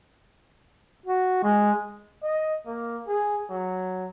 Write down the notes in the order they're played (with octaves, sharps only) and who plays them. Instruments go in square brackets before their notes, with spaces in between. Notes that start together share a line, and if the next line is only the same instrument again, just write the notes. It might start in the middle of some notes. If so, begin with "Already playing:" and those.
[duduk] F#4
G#3
[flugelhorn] D#5
A#3
G#4
F#3